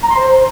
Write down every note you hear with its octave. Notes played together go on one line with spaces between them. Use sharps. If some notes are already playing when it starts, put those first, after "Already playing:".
A#5
C6
C5